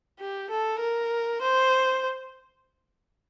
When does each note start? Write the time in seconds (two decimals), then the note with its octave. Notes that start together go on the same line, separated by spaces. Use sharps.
0.20 G4
0.50 A4
0.80 A#4
1.41 C5